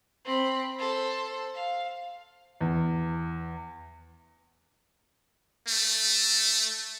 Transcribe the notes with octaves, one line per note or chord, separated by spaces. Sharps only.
C4 B5
A4 C5
F5
E2
A3